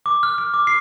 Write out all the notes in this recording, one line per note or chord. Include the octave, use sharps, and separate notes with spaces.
D6
F6
F6
D6
C7